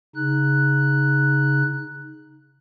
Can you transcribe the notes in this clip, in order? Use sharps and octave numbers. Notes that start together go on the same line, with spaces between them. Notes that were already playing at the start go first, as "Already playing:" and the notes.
C#3 D#4 F#6